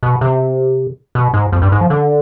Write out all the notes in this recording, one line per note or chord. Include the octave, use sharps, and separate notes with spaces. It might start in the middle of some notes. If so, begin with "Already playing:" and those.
B2
C3
B2
G#2
F2
G2
G#2
F3
D3